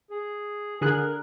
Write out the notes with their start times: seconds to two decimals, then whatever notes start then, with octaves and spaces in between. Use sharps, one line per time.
0.10 G#4
0.81 D3 G#4 A#4 F#6